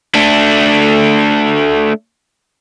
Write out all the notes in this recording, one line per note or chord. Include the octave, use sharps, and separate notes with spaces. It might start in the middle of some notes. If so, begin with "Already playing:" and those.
A3 D4